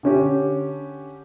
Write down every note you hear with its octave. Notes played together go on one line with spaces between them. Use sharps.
D3 C#4 G4